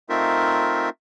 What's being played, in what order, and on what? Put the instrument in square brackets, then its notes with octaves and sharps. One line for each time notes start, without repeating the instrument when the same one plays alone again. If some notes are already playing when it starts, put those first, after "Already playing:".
[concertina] A3 C4 D#4 F4 A#4 E5